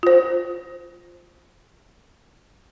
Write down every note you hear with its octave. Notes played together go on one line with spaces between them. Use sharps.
F4 C5